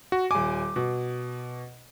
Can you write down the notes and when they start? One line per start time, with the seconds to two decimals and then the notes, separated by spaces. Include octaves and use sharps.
0.12 F#4
0.31 D#1 G#5 D6
0.76 B2